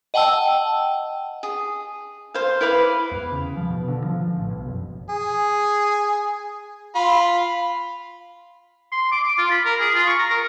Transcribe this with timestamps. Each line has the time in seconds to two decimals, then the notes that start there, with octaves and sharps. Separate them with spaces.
0.14 D#5 F#5 G5 A5 E6
1.43 G#4
2.34 C5 F5
2.61 E4 B4 F5 D6
3.11 E2
3.32 C#3
3.57 F3
3.70 B2
3.88 D3
4.04 F3
4.21 F3
4.36 A1
4.50 B1
4.68 F#1
5.10 G#4
6.95 F4 B5
8.92 C6
9.12 D6
9.24 D6
9.38 F4
9.51 B5
9.65 A#4
9.80 G#4
9.95 F4
10.07 C#6
10.19 A#5
10.30 A#4